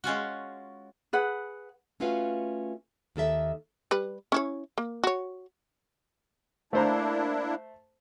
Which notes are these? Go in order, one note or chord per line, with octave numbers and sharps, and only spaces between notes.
G#3 C#4 F4 F#4
G#4 B4 F#5
A3 C#4 F4 F#4 B4 F5
D#2 D#3 A4 E5
G3 B4
C#4 E4 C#5
A#3
F#4 C#5
A3 A#3 D4 E4 C5 A#5